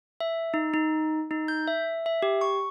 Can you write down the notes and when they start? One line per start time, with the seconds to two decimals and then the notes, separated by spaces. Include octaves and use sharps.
0.20 E5
0.54 D#4
0.74 D#4
1.31 D#4
1.48 G6
1.68 E5
2.06 E5
2.22 G4
2.41 C#6